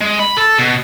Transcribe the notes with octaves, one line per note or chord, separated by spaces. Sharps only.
G#3
B5
A4
B2